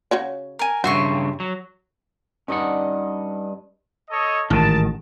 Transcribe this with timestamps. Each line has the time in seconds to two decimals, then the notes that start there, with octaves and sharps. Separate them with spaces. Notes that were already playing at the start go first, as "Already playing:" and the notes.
0.11 C#3 F#4 C#5
0.59 A#4 G#5
0.84 G2 C#3 F#4 E5 C6 C#6
1.40 F#3
2.48 G2 C#4 D#4 D#5 F#5
4.10 A4 C#5 D#5
4.50 A1 G#2 D#3 A5